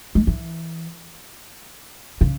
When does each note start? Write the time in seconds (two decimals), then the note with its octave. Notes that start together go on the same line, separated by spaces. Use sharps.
0.15 G#3
0.27 E3
2.21 C#3